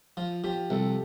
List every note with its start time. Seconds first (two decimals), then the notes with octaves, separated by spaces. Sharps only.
0.17 F3 F4
0.44 F3 G4
0.70 C2 A4